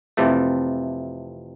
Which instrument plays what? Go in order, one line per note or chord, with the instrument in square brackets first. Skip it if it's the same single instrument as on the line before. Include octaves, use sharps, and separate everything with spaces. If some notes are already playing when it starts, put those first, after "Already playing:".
[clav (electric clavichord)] F2 C3 E3 A3